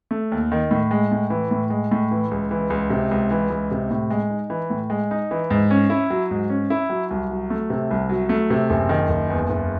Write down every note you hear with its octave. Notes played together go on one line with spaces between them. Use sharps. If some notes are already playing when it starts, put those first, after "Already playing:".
A3
D#2
D#3
A2
G#3
A2
E3
A2
G#3
A2
E3
C#2
E3
C#2
C3
C#2
E3
C#2
C3
A2
G#3
D#4
E3
A2
G#3
D#4
E3
G#2
C#4
E4
F#3
G#2
C#4
E4
F#3
C2
F#3
A3
C3
C2
F#3
A3
C3
F#1
D#3
F#1
E2
F#1